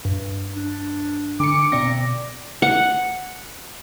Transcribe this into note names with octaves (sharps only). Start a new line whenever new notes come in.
G2
D4
D3 D6 C#7
B2 C4 D5 A#6
F#5